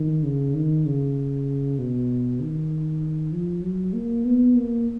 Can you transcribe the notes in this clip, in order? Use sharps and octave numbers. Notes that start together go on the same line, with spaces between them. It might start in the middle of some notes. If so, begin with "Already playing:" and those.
Already playing: D#3
C#3
D#3
C#3
B2
D#3
F3
F#3
A#3
B3
A#3